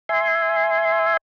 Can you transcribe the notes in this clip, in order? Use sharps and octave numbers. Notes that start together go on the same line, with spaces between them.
E5 G#5 C6